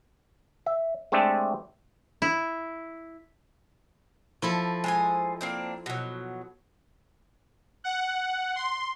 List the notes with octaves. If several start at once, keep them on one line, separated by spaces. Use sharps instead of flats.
E5
G#3 A3 C4 D4 G4 A4
E4
F3 E4 A4
G#3 C5 G#5
A#3 C4 D4
B2 F#3
F#5
C6